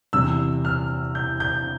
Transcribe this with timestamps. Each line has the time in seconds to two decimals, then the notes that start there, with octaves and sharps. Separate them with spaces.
0.13 E2 C3 G3 E6
0.65 F6
1.15 G6
1.40 G6